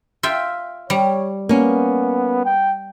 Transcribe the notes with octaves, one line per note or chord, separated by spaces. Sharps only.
F4 E5 G5
G3 C#5
A#3 B3 C#4
G5